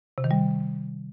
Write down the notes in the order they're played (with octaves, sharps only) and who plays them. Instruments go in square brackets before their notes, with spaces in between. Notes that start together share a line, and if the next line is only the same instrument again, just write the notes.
[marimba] C3
D#3
G3